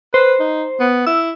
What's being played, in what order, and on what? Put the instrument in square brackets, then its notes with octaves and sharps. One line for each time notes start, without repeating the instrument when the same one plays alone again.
[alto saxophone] B4 [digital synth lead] C5
[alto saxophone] D#4
B3
[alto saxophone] E4 [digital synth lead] E6